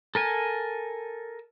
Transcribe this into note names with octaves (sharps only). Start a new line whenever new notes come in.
A4 A#4 G#5